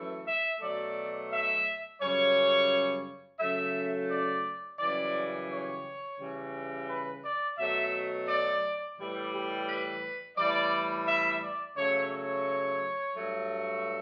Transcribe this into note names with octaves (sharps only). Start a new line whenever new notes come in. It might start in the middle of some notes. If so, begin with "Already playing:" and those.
Already playing: F#2 E3 A3
E5
B2 F#3 A3 D5
E5
F#2 C#3 G3 C#5
C#3 F#3 A3 E5
D5
F#2 C#3 E3 G3 D5
C#5
C#3 E3 G3
B4
D5
B2 F#3 A3 E5
D5
A2 E3 G3
G4
B4
A2 E3 G3 D5
E5
D5
C#3 F#3 A3 C#5
C#5
G2 F#3 A3